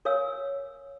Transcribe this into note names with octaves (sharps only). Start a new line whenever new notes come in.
A#4 C#5 F5 G#5 E6